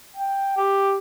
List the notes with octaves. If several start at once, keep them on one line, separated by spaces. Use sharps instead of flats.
G5
G4